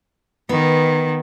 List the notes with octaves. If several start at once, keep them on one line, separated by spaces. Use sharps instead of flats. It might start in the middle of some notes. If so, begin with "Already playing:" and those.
D#3 B3